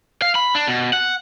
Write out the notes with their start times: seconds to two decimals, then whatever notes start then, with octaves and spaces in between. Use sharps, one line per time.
0.22 F5
0.35 B5
0.55 D4
0.67 B2
0.93 F#5